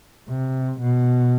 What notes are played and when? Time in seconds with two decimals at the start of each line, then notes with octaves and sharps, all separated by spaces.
0.28 C3
0.81 B2